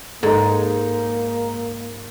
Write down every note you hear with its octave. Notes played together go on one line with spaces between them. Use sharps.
G#2 G#3 A#3 D#4 A4